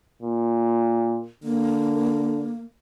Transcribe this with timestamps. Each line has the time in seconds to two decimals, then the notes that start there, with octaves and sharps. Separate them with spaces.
0.22 A#2
1.44 D3 A#3